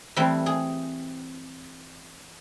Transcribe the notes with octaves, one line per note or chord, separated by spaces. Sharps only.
E3 G3 A3 C4
G#4